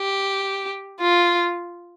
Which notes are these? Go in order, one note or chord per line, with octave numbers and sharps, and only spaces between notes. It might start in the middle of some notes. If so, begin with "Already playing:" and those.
Already playing: G4
F4